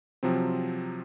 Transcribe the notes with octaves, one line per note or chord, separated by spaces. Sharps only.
C3 F3 F#3 C4